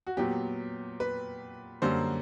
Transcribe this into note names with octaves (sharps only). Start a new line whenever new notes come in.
F#4
A#2 F#3 B3 G4
B4
F#2 D3 G3 A#3 C5